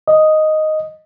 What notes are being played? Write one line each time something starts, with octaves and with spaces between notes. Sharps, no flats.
D#5